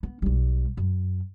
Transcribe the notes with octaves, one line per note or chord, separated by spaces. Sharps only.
B3
B1 G3
F#2